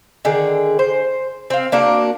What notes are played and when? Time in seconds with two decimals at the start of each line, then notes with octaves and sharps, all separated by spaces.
0.25 D3 D#3 G#4
0.79 C5
1.50 C4 F5
1.72 A#3 D4 F#4 A#4